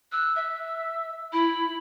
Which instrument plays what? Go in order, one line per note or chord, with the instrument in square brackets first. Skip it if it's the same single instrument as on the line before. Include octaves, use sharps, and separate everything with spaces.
[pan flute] E6 [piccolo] F#6
[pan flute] E5 [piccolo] E6
[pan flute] E4 [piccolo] B5